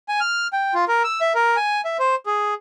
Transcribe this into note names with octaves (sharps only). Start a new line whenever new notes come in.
G#5
F6
G5
F4
A#4
E6
E5
A#4
G#5
E5
C5
G#4